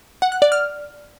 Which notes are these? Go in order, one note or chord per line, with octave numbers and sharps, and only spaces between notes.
F#5
F#6
D5
F6